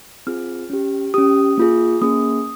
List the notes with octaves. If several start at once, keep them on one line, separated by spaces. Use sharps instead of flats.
C4 F4 G#4 F6
C#4 G4
C#4 G4 D#6
A#3 F4 G#4
A#3 C#4 G#4 D#6